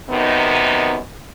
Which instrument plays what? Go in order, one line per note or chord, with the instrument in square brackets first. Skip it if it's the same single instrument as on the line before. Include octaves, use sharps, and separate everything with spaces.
[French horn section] F#2 C3 D#3 B3 D#4